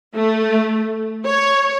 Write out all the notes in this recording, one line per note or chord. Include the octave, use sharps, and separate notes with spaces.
A3
C#5